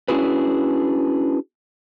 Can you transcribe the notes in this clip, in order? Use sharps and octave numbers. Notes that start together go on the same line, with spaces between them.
C#4 D4 E4 F#4 G#4 B4